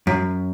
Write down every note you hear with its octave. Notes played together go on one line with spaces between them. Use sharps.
F#2